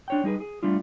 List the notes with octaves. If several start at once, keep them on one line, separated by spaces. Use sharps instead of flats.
D4 C#5 G5
G3 D#4 G#4 B4
G#4
G3 A3 D4 F4